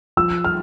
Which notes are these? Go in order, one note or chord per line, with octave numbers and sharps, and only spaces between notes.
F3 E6
F6